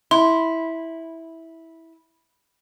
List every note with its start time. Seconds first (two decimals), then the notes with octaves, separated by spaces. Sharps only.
0.11 E4 C6